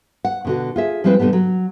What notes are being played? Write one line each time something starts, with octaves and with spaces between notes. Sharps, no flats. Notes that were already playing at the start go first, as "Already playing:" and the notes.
F#5
B2 D3 F#4
F4 G#4 E5
F3 G3 G#3 C4 E4 B4
B2 D3 G3 A3 B3
F#3